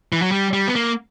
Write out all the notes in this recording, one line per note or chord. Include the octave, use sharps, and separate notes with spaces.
E3
F#3
G3
G3
B3
A#3